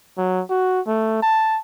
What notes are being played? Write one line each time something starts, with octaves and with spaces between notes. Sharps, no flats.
F#3
F#4
A3
A5